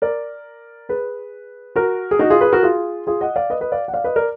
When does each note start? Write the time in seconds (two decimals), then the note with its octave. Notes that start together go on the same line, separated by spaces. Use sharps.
0.02 A#4 D5
0.89 G#4 B4
1.76 F#4 A#4
2.11 G#4
2.19 D#4 F#4
2.30 F4 G#4
2.41 G#4 B4
2.52 F#4 A#4
2.63 F4 G#4
3.07 F4 G#4
3.21 D#5 F#5
3.36 D5 F5
3.50 B4 D#5
3.61 B4 D#5
3.72 D5 F5
3.88 F#5
3.94 D5 F5
4.04 B4 D#5
4.16 A#4 D5